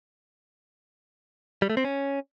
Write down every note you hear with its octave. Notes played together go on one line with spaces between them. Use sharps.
G3
A3
C4
C#4